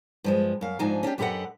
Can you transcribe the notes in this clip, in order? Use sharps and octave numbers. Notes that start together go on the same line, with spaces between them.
G2 F3 G#3
F#2 F5
G#2 F3 D4 D#4 G#5 A#5
C#4 D4 F4 G4
F#2 G4 A4 B4 D#5 F#5